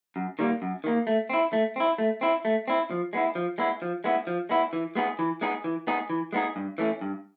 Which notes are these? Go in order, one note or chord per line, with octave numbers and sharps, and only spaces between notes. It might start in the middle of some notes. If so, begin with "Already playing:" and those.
F#2
D#3 G3 A#3
F#2
D#3 G3 A#3
A3
C4 E4
A3
C4 E4
A3
C4 E4
A3
C4 E4
F3
G#3 B3 E4
F3
G#3 B3 E4
F3
G#3 B3 E4
F3
G#3 B3 E4
E3
G#3 B3 D#4 G#4
E3
G#3 B3 D#4 G#4
E3
G#3 B3 D#4 G#4
E3
G#3 B3 D#4 G#4
G2
E3 A3 C#4
G2